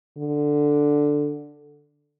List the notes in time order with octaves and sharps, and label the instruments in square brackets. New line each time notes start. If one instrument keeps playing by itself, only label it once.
[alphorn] D3